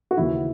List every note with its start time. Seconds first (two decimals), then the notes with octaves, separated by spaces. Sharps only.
0.11 F#4
0.17 D#2 C#3 E3 E4